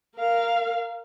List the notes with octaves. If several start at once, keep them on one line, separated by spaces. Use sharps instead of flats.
A#4 F5